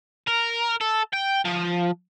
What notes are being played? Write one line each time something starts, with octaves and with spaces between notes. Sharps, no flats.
A#4
A4
G5
F3